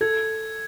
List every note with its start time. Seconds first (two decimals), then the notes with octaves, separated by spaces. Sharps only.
0.01 A4 G#6